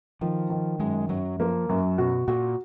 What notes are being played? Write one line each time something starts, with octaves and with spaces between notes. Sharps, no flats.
D#3 F3
D#3
F#2 G#3
F#2 F#3
F3 A#3
F#2 F#3
B2 F#4
A#2 F#4